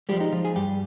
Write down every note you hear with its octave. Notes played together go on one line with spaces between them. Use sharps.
F3 G3 G#3 G4
D#4
F3 F4
G#4
G2 G3 G4